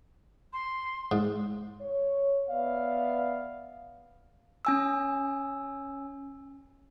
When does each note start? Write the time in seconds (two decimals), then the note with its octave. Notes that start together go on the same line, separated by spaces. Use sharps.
0.53 C6
1.12 G#2
1.81 C#5
2.49 B3 D5 E5 F5
4.65 C#4 G#5 E6